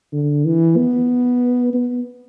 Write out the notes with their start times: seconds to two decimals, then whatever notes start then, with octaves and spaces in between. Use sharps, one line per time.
0.13 D3
0.45 E3
0.77 B3
1.74 B3